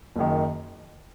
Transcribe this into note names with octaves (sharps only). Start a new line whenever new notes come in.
F#1 F#2 D#3